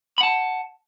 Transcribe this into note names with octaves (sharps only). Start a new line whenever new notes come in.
F#5 A5 B5